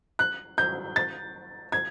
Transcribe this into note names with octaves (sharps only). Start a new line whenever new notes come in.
F#6
G6
A6
G#6